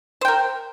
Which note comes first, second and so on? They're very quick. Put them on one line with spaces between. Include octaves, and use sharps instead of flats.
C5 G5 A#4